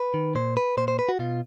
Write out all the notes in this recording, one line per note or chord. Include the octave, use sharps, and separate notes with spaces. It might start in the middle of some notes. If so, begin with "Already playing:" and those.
Already playing: B4
D#3
A#2 C5
B4
A#2 C5
C5
B4
F#4
B2 F4